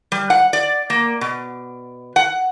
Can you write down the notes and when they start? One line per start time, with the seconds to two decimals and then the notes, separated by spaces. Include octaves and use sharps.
0.12 G3
0.30 F#5
0.53 D5
0.90 A#3
1.21 B2
2.16 F#5